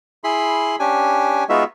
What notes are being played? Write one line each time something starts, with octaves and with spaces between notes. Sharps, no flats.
E4 G#4 B5 C6
C#4 D4 G4 G#5
G#3 B3 D#4 F4 F#4 E5